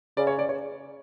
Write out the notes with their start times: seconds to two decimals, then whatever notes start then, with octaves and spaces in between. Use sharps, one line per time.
0.17 C#3 D5
0.27 C#5
0.39 D5
0.49 C#5